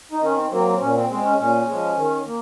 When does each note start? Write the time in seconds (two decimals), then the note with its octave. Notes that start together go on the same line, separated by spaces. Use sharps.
0.12 D#4
0.22 D#3 C#4
0.36 C4
0.51 F#3 A#3 C4
0.66 C4
0.80 A#2 C#4
0.95 C4
1.09 G#3 C4
1.24 C#4
1.38 A#2 C#4
1.67 F3 G#3
1.96 D#3
2.26 A#3